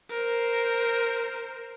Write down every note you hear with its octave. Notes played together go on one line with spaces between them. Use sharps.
A#4 C5